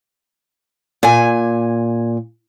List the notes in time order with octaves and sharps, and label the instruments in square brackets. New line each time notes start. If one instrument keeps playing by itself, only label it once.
[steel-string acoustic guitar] A#2 G#5